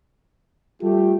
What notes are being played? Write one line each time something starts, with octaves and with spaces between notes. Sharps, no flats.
G3 A3 F4 G4